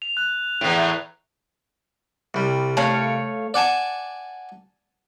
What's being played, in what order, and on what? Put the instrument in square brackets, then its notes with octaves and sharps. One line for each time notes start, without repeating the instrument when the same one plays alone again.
[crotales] F7
F#6
[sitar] E2 A2
[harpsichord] C2 G3
[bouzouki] A3 C#5 F5
[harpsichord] D5 F#5 G#5 A5